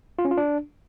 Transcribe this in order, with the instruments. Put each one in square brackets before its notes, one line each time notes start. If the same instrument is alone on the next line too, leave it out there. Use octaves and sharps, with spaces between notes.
[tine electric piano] F4
C#4
F4
D4